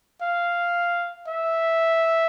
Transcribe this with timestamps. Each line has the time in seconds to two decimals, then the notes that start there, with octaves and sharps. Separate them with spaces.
0.22 F5
1.28 E5